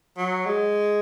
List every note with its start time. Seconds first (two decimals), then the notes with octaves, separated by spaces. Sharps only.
0.17 F#3
0.46 G#3